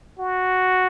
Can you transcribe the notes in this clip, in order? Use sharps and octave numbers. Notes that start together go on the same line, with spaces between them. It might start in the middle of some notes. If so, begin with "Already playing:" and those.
F#4